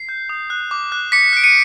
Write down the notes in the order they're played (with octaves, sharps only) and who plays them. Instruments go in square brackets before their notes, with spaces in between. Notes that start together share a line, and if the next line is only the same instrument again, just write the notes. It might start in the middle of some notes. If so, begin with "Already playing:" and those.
Already playing: [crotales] C7
G6
D#6
F#6
D6
F#6
D6 B6 C#7
F#6 D7
C#7 D#7